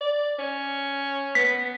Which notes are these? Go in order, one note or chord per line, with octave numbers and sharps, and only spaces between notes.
D5
C#4
B3 B6